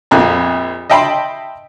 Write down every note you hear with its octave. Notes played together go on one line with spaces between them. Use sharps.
A#1 F2 F#6
D#5 E5 G5 A5 B5 C6